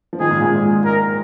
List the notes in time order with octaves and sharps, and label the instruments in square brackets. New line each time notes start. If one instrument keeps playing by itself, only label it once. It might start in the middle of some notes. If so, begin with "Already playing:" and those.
[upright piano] F3
[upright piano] D#3 G#3 [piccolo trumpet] G#4
[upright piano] A#2
G#2
A#2
[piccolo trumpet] A#4